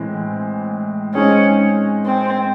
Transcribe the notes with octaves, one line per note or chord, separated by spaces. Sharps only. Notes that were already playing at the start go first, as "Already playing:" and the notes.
Already playing: A2 E3 G#3 C4
G#3 C4 C#4 D#4 G#4
C4